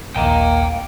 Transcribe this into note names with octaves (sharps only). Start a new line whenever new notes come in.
A#1 D#2 A#3 F5 G5 A#5